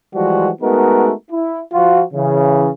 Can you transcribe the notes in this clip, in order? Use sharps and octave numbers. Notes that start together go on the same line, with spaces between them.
E3 F3 G3 G#3 F#4
G#3 A3 B3 D#4 F#4 A#4
E4
F3 F4 F#4
C#3 E3